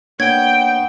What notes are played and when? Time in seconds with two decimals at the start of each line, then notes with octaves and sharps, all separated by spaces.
0.20 A#3 B3 D4 C#5 G5 C#6 E6 G#6